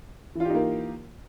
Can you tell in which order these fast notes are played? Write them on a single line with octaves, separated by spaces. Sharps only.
E3 F4 G4 D#4 A#3